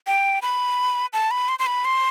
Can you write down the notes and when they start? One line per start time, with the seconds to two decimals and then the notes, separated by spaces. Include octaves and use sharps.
0.07 G5
0.42 B5
1.13 A5
1.31 B5
1.49 C6
1.59 C6
1.66 B5
1.85 C6